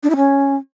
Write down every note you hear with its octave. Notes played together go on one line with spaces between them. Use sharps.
D4
E4
C#4